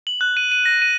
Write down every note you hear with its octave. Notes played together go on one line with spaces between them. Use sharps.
F#7
F#6
D#7
D#7
A#6
D#7